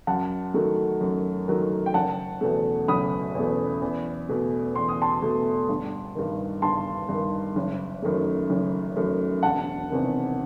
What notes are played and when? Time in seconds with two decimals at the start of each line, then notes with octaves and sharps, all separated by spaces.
0.07 F#2 F#5 A5
0.54 D#3 F#3 A3
1.01 F#2
1.48 D#3 F#3 A3
1.86 G5
1.94 F#1 F#5 A5
2.41 E2 B2 A3
2.88 F#1 B5 D#6
3.35 E2 B2 A3
3.82 E2
4.29 B2 A3
4.75 E2 C6
4.89 D#6
5.02 A5 C6
5.22 B2 A3
5.69 G1
6.15 G2 D#3
6.62 G1 A5 C6
7.09 G2
7.14 D#3
7.56 F#1
8.02 F#2 D#3 A3
8.50 F#1
8.96 F#2 D#3 A3
9.43 E1 F#5 A5
9.90 E2 C3 D#3